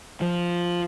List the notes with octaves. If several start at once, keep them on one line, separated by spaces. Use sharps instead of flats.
F3